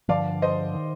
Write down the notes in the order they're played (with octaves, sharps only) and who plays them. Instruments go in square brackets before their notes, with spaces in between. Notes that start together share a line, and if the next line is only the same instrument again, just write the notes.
[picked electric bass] G2 D3 F3 [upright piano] D5 F5
[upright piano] C5 D#5
[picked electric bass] D#3